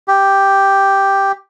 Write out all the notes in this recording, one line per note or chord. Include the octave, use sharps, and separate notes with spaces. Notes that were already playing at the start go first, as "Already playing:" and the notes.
G4